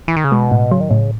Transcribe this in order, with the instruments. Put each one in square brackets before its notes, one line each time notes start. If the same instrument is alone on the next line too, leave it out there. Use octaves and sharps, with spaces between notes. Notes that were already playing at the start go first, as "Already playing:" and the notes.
[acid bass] E3
D#3
C#3
[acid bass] B2 [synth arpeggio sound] G#3
[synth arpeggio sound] A2
[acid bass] C#3 [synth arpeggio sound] F#3
[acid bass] D#3
[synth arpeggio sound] A2 [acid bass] C#3